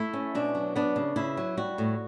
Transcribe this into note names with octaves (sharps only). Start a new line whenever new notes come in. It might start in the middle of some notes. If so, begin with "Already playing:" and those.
Already playing: A3 E4
C#4
B2 D4
F#3
B3 D4
C#3
C#3 E4
F#3
G3 F#4
A2